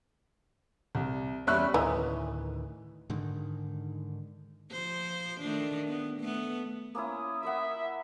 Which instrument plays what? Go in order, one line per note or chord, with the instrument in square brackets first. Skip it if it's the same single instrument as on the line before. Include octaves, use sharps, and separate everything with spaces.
[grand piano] C2
E2 G3 C#4 E5 C#6 F#6
[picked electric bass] D2 A2 D#3 [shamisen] E3 D#4
[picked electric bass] G#2 D3 D#3
[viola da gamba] F3 C5
D#3 A3 D4
B3
A3 B3
[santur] A#3 C#4 E4 [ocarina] D#6
[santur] E4 A#4 F#5 [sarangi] E5